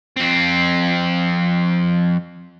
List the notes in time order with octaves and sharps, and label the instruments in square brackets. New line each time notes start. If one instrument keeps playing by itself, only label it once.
[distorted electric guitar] F2 C4